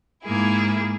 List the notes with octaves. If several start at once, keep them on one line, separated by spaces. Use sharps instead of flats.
G#2 A#3 E4 G#4